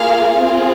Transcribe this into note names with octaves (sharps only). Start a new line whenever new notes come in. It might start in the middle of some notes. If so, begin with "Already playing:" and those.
Already playing: A#3 F4 G#4 F5
C4 F4 G#4